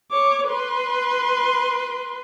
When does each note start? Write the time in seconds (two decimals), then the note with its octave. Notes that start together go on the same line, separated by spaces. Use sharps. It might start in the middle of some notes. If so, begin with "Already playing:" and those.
0.11 C#5 D6
0.48 B4 C6